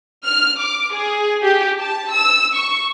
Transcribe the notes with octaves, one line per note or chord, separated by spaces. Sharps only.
F6
D6
G#4
G4
A5
E6
C#6